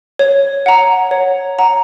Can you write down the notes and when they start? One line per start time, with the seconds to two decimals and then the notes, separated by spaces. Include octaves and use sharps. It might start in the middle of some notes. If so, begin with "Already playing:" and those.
0.19 C#5
0.66 F#5 A#5
1.11 C#5
1.59 F#5 A#5